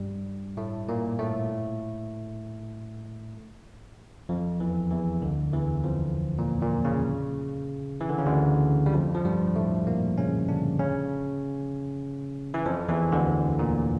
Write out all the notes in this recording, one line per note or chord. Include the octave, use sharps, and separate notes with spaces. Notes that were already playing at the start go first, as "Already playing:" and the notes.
Already playing: G2 G3
A2 A3
A#2 A#3
A2 A3
F2 F3
E2 E3
E2 E3
D2 D3
E2 E3
F2 F3
A#2
A#2
C#3
E3
D3
C#3
D2 D3
G3
F2 F3
F3
G2 G3
A2 A3
A#2 A#3
C#3 C#4
D3 D4
C#3 C#4
E3
F2 F3
E2 E3
D2 D3
A#2